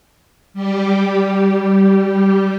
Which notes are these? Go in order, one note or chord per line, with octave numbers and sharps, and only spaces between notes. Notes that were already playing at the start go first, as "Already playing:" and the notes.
G3 G4